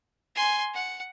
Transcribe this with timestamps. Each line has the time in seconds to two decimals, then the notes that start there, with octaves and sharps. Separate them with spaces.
0.35 G#5 C6
0.74 F#5